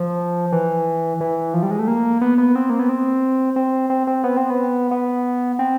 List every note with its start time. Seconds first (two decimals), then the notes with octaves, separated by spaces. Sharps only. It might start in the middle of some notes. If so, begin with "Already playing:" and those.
Already playing: F3
0.52 E3
1.21 E3
1.54 F3
1.63 G3
1.71 G#3
1.79 A3
1.88 A#3
2.21 B3
2.38 B3
2.55 C4
2.70 A#3
2.79 B3
2.89 C4
3.56 C4
3.90 C4
4.07 C4
4.24 B3
4.37 C4
4.50 B3
4.91 B3
5.59 C4